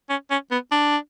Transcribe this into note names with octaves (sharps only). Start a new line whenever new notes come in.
C#4
C#4
B3
D4